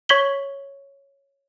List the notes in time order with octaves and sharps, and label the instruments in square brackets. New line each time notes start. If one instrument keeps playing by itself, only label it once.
[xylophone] C#5 C#6 G#6 B6 F#7 G7